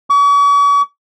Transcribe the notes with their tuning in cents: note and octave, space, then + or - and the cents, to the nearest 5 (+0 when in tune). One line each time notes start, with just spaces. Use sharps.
C#6 +45